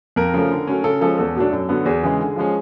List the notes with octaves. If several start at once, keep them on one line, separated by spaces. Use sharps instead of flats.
F2 A#4
C#3 F3 A3
D3
F#3 A3 C#4
C#3 A4
F3 G#3 C#4 A4
E2 A4
B2 F#3 A3 D4
F#2
D3 F#3 B3
E2 G#4
C#3 E3 G#3
D3
F3 G#3 C#4